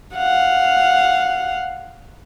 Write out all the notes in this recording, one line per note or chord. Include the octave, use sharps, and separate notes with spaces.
F5 F#5